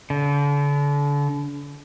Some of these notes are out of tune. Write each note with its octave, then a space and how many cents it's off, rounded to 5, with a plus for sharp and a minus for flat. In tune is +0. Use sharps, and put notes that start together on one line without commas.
D3 -40